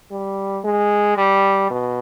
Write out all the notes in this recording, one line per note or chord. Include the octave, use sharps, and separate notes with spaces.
G3
G#3
G3
B2